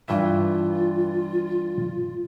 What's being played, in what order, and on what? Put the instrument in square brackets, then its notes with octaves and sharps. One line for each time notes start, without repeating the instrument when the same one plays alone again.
[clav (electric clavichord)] G2 E3 E5 [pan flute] F4